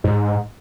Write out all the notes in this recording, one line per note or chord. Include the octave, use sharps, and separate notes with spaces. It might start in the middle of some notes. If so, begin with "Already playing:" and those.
G#2